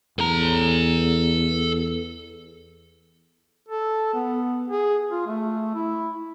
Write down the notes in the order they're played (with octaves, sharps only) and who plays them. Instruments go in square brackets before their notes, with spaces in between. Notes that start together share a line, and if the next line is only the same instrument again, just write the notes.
[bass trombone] E2 [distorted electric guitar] A4 A#5
[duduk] A4
B3
G#4
F4
A3
E4